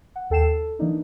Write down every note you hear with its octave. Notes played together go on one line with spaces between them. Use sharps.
F#5
D#2 A4 G5 C7 E7
A4
E3 A#3 D4 D#4